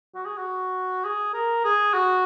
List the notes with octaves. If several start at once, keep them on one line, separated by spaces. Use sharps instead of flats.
F#4
G#4
F#4
G#4
A#4
G#4
F#4